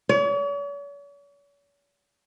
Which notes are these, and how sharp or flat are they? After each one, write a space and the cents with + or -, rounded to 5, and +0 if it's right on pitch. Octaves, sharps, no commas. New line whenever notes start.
C#5 +45